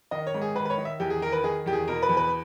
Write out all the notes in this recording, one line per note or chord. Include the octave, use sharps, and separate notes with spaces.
D#3 D#5
C#5
G#2
G#4
D#3 B4
B4
C#5
D#3
E5
E2 G4
G#4
D#3 A#4
B4
D#3 G#4
E2 G4
G#4
B2 A#4
B4
E2
B4